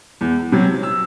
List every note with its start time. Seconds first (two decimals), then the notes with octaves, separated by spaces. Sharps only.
0.21 E2
0.52 C3 F#3
0.83 E6